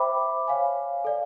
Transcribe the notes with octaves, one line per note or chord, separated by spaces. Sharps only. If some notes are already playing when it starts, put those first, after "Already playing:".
Already playing: C5 E5 G5 B5 D6
C#5 F5 G#5
A4 D5 F5